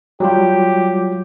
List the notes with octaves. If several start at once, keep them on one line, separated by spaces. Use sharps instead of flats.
F#3 G3 F4 G4